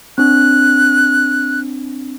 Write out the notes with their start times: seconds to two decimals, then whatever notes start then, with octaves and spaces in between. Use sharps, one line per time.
0.18 C4 D4 F#6